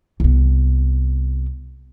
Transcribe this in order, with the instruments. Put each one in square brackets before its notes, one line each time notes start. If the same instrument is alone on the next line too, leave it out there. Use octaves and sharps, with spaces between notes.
[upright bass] C2 B3